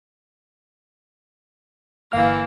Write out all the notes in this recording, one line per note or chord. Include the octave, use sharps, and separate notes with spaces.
G1 E3 A#3 F5 F6